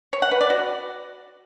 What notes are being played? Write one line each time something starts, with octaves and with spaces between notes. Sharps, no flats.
C#5
F#5
B4
D5
F#4